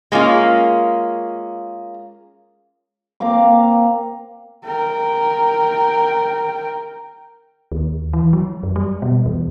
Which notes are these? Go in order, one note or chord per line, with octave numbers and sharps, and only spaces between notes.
G#3 A#3 C#4 F4
A#3 C4 F5 D6
A#4 G5
D#2
E3
F#3
F#2
G3
B2
E2